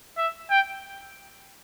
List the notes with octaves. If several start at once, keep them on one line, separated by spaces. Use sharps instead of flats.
E5
G5